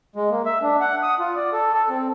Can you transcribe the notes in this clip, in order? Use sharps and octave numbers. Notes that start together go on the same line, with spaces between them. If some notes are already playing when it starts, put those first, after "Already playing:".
G#3
A#3
E5
D4
F#5
D#6
F4
D5
A4
A4
C4